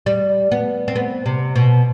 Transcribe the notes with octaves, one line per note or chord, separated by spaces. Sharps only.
G3
B3
C4
B3
C3
B2